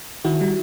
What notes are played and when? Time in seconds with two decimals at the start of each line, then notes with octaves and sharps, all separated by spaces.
0.25 D#3 E4 F#4
0.41 G3